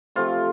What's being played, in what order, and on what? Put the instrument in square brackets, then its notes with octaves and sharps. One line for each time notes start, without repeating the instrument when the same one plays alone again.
[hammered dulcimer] C3 F3 A3 F4